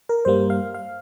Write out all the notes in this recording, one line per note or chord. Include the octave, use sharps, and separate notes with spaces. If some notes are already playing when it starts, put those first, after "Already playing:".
A#4
G2 G3 A#3 C5
F5
F5